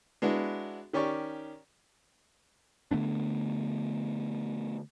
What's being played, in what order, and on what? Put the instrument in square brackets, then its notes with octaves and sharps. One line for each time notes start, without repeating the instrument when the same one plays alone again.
[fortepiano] G#3 B3 D4 E4 F#4
D#3 C#4 G4 D5 C#6
[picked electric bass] D3 A3 B3 D4